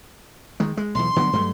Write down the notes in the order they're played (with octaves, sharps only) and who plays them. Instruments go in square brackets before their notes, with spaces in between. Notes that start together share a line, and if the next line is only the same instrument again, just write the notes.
[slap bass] D#3 G#3
G#3
[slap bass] B1 E2 [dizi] C6
[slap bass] D3 F#3 B3
G2 F#3 A3